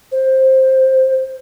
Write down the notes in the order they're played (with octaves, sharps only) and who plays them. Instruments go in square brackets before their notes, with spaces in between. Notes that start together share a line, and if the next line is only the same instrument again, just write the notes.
[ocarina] C5